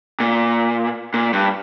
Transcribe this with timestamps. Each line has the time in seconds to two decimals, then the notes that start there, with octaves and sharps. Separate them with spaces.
0.20 A#2
1.14 A#2
1.33 G2